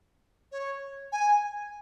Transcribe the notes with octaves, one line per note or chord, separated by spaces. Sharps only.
C#5
G#5